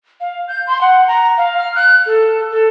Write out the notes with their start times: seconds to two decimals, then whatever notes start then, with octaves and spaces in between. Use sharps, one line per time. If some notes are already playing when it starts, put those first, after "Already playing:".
0.21 F5
0.48 G6
0.67 C6
0.81 F#5
1.08 A#5
1.38 F5
1.58 F6
1.75 F#6
2.06 A4
2.51 A4